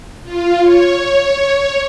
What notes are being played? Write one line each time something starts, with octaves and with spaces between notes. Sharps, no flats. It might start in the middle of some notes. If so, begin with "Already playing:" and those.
F4
C#5